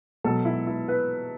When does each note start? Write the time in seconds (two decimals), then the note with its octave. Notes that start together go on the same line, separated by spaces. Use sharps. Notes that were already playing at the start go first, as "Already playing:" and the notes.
0.24 B2 F#3 A4
0.45 E4
0.67 E4
0.88 B4